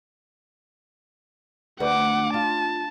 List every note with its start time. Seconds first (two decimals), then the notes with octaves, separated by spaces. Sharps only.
1.80 D2 B4 F#5 D6
2.34 F4 A5